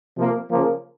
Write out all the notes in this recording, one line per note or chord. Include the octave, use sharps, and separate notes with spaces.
C3 F3 A#3
C#3 F3 A#3